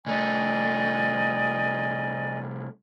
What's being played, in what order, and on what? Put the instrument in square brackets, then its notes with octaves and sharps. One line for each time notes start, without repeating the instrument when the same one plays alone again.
[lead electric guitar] C2 A3 [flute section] D5 D#5 G#5